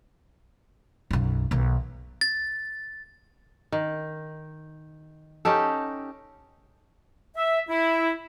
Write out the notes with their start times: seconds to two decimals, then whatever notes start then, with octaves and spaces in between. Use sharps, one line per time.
1.11 B1 F#2
1.51 B1 D#3
2.21 A6
3.72 D#3
5.45 C#4 D#4 G4 A4
7.37 E5
7.69 E4